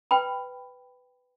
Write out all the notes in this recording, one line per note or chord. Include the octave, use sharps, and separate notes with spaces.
B4 G5 B5